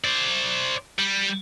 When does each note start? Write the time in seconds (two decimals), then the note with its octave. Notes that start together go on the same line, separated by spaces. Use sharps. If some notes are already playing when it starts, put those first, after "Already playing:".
0.04 C5 D5
0.98 G3